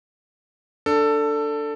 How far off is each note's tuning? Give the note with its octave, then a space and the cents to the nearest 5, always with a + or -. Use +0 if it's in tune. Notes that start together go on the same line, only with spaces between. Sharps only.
D4 +0 A4 +15